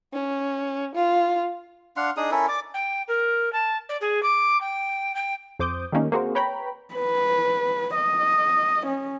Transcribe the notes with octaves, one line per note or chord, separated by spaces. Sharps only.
C#4
F4
D4 F5 F#5 C6
D4 D#4 G#4 D#6
C#4 E4 A4 A#4
D5 D6
G5
A#4
A5
D5
G#4
D6
G5
G5
F2 C5 D6 D#6 G6
D#3 G3 A3 A#3 C#4 D#4
A#3 C4 F#4 G#4 A#4 C5
B4 C#5 G5 A#5 B5
B4
D#5
C#4